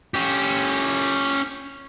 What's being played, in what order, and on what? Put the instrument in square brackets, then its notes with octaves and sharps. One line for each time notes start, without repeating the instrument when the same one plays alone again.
[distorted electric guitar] C#4 G4